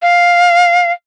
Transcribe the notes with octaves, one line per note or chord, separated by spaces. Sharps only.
F5